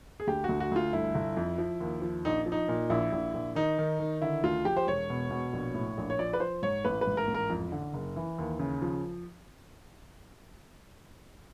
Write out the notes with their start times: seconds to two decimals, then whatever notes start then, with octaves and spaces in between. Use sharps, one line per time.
0.20 G#4
0.27 D2 G4
0.44 D2 F#4
0.60 F#4
0.71 D2 F4
0.93 G1 E4
1.15 G1
1.37 F2
1.58 F3
1.80 D#2
2.02 F3
2.25 A#1 D#4
2.46 F3
2.52 D#4
2.68 A#2
2.90 A#1 E4
3.12 A#1
3.34 A#1
3.55 D#3 D#4
3.78 D#3
4.00 D#3
4.22 D3 E4
4.43 D2 F4
4.65 F3 G4
4.77 C5
4.87 E1 C#5
5.10 B2
5.31 B2
5.53 A#1
5.74 A2
5.98 A#1
6.10 C#5
6.19 F3 D5
6.33 B4
6.40 F3 C5
6.63 G#2 C#5
6.85 A1 B4
7.01 B4
7.07 G#2
7.17 A#4
7.28 A1
7.34 A#4
7.50 F2
7.72 D3
7.94 F#1
8.16 E3
8.38 D#2
8.59 C#3
8.82 F3